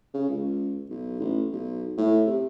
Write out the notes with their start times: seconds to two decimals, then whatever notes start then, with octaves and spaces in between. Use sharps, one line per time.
0.14 C#3
0.29 C#2
0.90 B1
1.20 A1
1.52 B1
1.97 A2
2.26 C3